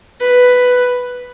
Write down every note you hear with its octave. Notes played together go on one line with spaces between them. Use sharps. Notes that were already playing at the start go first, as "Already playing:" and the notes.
B4